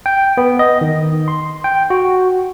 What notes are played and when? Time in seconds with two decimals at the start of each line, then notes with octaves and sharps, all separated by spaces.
0.06 G5
0.37 B3
0.59 D#5
0.81 D#3
1.28 C6
1.64 G5
1.90 F#4